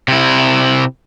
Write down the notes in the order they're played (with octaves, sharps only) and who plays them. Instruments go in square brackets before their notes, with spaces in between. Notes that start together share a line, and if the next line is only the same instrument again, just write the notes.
[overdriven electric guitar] C3 E4